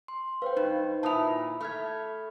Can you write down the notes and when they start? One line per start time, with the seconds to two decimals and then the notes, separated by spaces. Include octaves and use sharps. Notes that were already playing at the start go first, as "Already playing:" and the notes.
0.08 C6
0.42 B4 C5 F5 G5
0.57 G2 D#4
1.03 A#2 E4 A5 D#6 F7
1.61 A3 B5 F6 G#6